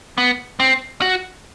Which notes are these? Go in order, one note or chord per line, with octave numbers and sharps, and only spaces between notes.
B3
C4
F#4